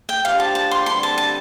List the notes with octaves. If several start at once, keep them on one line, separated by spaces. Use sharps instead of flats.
G5
F3 D4 G4 F5
A5
A5
C6
G2 D3 G3 C4 C6
A5
A5